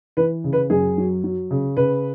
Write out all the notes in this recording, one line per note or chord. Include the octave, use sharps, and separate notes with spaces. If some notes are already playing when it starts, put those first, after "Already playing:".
E3 B4
C#3
B4
F#2 G#4
F#3
F#3
C#3
C#3 B4